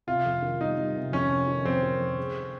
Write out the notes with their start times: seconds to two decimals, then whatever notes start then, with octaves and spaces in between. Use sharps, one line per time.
0.07 C3 F4
0.25 F2
0.42 D#3
0.61 G3 D#4
0.77 G3
0.96 C3
1.12 F2 C#4
1.30 C3
1.48 D#3
1.65 F2 C4
1.83 D#3
2.00 F2
2.18 G#4
2.35 G#4